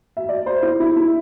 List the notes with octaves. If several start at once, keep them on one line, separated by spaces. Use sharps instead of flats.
E5
D5
C5
E4
E4
E4